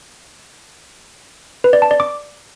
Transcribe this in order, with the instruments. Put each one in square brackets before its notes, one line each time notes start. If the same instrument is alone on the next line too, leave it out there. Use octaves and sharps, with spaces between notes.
[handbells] B4
D5
A5
D5
D6